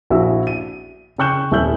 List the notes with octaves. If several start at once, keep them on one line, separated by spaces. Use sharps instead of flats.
A#1 E4 F#4 E6
D#7
C#3 G5 C#6 F#6 G6 E7
D#1 E4 E6 G6 F#7